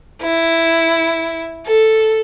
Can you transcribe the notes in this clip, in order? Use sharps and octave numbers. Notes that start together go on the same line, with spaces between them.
E4
A4